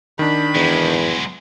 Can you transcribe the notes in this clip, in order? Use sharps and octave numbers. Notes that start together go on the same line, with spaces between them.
D#3 D4 B5
E2 F#3 G#3